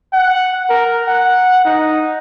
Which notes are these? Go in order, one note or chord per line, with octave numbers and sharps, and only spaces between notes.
F#5
A#4
F#5
D#4